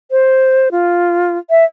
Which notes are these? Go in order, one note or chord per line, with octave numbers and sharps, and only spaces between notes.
C5
F4
E5